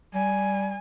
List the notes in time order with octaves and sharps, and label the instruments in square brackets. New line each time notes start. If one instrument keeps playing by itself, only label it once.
[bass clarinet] G3 [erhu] G#5